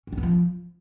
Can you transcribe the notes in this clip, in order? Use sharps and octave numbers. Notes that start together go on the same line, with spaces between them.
C#4
D4
B3
F3